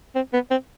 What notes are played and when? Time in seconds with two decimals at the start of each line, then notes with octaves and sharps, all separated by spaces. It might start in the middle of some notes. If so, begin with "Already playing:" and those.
0.15 C4
0.33 B3
0.51 C4